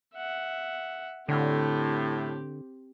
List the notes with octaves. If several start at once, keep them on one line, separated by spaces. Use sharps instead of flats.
E5 F#5
A2 D3 C4 G4